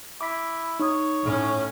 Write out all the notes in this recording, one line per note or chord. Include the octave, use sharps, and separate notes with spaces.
E4 D6 B6
D#4 C#5 D#6
A2 C#4